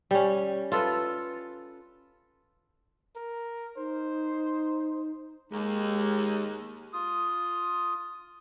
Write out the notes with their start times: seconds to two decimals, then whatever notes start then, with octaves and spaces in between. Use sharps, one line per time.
0.11 G3 C#4
0.72 F4 A4 B4
3.16 A#4
3.77 D#4 C5
5.52 D#2 G#3
6.93 F4 D#6